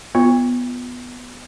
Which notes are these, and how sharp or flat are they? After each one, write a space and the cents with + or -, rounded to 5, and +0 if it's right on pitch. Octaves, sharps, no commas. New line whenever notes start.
B3 +0 F4 +0